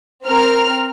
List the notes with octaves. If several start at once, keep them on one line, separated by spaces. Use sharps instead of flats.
C4 A#4 F6